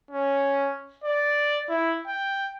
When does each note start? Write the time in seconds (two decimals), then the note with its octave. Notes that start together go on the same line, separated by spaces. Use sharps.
0.11 C#4
1.04 D5
1.69 E4
2.07 G5